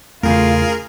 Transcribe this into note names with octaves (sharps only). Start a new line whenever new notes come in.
E2 C#3 A3 F4 G#4 A#4